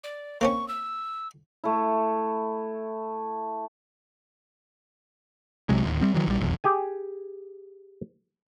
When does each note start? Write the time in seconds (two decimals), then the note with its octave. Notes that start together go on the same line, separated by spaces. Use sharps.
0.04 D5
0.41 A#3 C4 C#4 C#6
0.68 E6
1.64 A3 E4
5.69 C2 C3 F#3 G#3
5.84 D1 D#2
6.01 G3 C4
6.14 D#3 E3 F#3
6.27 A#1 G3
6.40 F1 B1 E2
6.64 G4 G#4 G#5